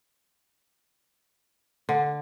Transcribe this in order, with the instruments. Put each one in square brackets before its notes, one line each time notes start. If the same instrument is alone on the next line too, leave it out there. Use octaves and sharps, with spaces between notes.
[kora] D3